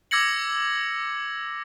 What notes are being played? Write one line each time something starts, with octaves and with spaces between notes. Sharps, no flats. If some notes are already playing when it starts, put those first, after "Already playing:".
D6 E6 G#6 A#6 C#7 F#7